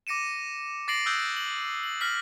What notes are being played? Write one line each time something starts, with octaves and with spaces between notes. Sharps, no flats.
D6 A#6 C#7 D#7 E7
D6 A6 A#6 C7 D7 F#7
D#6 E6 F#6 G6
F#7
F#7
F6 A#6 B6 F#7